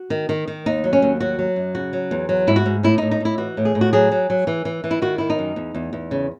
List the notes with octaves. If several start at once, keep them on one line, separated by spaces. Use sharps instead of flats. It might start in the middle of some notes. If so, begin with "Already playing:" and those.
Already playing: F#4
D#3
D#3
D#3
D#2 D#4
F#3
C#4
D#2
F#3 F#4
F#3
F#2
C#3 F#4
F#3
E2
F#3
G#2 E4
F#4
G#2
A2 E4
A2 D#4
D#4
A2 E4
E3 F#4
A2
G#4
A2
F#4
F#3 G#4
F#3
F#3
E3
E3
E3
E4
D#3 F#4
D#3 E4
D#4
F#2
E2
E2
E2
C#3